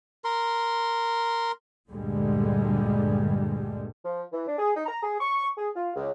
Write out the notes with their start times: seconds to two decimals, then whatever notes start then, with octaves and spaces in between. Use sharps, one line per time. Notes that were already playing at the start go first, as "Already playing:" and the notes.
0.24 A#4 C6
1.90 D2 G2 A#2 D3 G3 G#3
4.04 F3
4.31 E3
4.47 D4
4.58 G#4
4.75 D#4
4.86 A#5
5.01 G#4
5.19 C#6
5.57 G#4
5.75 F4
5.94 C#2